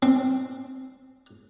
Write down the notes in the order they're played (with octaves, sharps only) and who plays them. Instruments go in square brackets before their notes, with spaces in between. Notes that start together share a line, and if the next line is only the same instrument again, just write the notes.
[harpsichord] C4